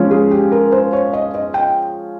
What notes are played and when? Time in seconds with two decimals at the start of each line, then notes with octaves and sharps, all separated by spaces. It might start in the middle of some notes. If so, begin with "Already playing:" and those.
Already playing: F3 G#3 C#4
0.11 G#4
0.31 G4
0.52 A#4
0.72 C5
0.93 C#5
1.13 D#5
1.34 D#5
1.54 G5